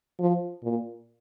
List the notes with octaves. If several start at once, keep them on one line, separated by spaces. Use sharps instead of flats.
F3
A#2